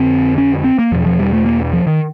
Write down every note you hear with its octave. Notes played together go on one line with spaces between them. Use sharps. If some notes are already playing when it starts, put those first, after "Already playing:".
Already playing: F2 D3 C4
C#4
C4
A#3
E2 B2 F3
F3
G3
A3
A#3
F3
D#3